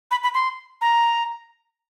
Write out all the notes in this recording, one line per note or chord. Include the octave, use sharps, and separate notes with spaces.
B5
B5
C6
A#5